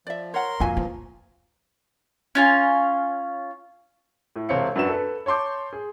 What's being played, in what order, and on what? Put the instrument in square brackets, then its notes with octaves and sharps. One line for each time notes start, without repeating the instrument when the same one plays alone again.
[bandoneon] F3 [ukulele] D5 E5
[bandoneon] A#4 C6 [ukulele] C#5 F#5
[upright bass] F2 [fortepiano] A#2 [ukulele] F#4 E5 G#5
[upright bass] E3 [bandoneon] F3
[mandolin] C#4 F4 G#5
[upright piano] A2
E1 C3 C4 C#5 F5 C#7
F#2 D4 F#4 B4 E7
A4 B4
C#5 A5 C6 D6 G6
G#4